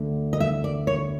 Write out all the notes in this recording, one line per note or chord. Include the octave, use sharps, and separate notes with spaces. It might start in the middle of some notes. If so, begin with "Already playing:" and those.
Already playing: D2 D3
D#5
E5
D5
C#5